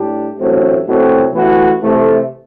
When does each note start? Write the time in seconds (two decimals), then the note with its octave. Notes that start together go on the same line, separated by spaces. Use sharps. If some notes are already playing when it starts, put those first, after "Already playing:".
Already playing: A2 G3 D4 G4
0.39 A1 G2 F#3 A3 C4
0.86 C2 B2 F#3 A3 C4
1.33 A1 A2 E3 B3 F#4
1.81 C3 E3 A3